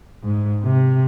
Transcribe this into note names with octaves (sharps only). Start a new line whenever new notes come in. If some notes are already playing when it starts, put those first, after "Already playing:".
G#2
C3